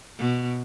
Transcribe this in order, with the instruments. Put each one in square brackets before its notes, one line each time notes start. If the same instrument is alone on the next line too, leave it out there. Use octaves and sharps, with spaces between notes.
[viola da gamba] B2